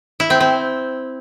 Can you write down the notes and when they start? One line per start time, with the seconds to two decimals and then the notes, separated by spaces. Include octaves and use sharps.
0.20 E4
0.30 C4
0.40 C4